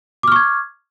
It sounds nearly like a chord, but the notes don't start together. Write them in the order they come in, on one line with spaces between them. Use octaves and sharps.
D6 F6 C#6 G#6